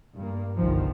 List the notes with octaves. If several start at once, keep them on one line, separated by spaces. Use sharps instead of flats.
G2 G3 A#3
G1 C2 F#2 D#3 F3